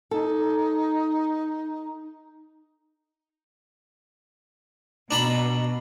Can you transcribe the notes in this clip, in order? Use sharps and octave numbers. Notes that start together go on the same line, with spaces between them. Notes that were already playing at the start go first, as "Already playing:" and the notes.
D#4 A4
B2 D4 A#5 B5